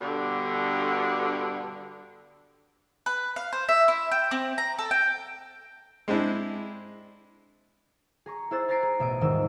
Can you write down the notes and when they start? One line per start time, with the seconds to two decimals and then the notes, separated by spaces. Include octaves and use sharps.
0.01 G2 B2 D3
3.06 B4
3.36 F5
3.53 C5
3.69 E5
3.88 E4
4.11 G5
4.31 C4
4.58 A#5
4.79 A4
4.91 G5
6.08 G#3 C4 D4 E4
8.26 G#4 A#5 C#6
8.51 E4 G#4 C5 E6 F#6 A6
8.68 G#5 A#5 A6 A#6 C7 D7
8.83 G#4
8.99 A1 B2 E5 D#6 D7
9.21 D#1 G#2 D#3 E3 C4 E6